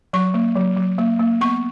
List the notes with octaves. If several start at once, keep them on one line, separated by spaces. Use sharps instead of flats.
F#3 C#6
A#3
F#3
F#3
A#3
A#3
B3 C#6